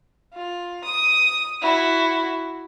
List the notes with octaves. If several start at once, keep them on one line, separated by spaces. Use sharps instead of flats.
F4
D#6
E4 F#4